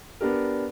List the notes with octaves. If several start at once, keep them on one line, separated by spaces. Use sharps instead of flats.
B3 D4 G4 A#4